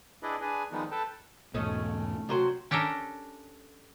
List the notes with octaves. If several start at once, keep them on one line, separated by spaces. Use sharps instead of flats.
D4 E4 G#4 B4 D5 D#5
D4 G#4 B4 G#5
D#3 F3 G3 G#3 B3 D#4
A4 B4 G5 A5
E2 G#2 B2 A3 C#4 D#5
C3 F#3 C5
C#4 D4 G4 A4 A#4